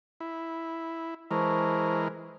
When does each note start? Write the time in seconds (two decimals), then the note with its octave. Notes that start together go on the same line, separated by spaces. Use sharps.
0.20 E4
1.31 E3 G#3 A#4 C5 A5 C#6